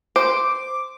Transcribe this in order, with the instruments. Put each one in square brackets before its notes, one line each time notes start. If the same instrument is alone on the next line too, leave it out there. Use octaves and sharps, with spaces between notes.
[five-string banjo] C5 [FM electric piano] D6